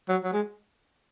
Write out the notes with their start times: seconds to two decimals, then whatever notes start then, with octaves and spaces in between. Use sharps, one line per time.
0.09 F#3
0.24 F#3
0.33 G#3